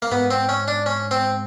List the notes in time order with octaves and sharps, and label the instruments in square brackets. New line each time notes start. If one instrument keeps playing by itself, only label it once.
[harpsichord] A#3
[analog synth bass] G#2 [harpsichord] B3
[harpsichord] C4
C#4
D4
C#4
C4